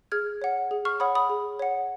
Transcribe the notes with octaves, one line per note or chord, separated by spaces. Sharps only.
G#4 F6 G#6
C#5 F#5
G#4
C#6 F6
C#5 F#5 B5 D#6
B5 D#6
G#4
C#5 F#5